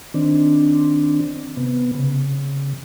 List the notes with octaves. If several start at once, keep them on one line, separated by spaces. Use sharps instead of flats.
D#3 C4 D4
C3 B3
C#3